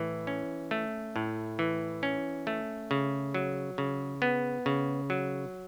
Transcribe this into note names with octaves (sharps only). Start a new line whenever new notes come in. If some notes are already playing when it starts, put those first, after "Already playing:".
Already playing: A2 E3
C#4
A3
A2
E3
C#4
A3
C#3
F#3
C#3
B3
C#3
F#3